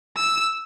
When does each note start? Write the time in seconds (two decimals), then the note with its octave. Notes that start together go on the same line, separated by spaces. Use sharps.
0.17 E6